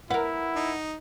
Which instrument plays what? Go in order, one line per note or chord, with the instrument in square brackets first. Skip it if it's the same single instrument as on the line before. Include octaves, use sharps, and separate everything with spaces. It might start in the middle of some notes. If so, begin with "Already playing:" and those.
[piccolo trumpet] E4 [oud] A#4 B4 [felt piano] F#5
[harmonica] D#4